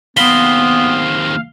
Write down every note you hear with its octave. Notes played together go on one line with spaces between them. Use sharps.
D#2 B3 C4 F5 B5 C6